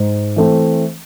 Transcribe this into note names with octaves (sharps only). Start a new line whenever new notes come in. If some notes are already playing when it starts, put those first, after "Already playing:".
Already playing: G#2
E3 A3 C4